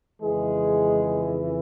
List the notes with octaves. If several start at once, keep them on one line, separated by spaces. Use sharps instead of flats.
F2 C#3 E3 G#3 G#4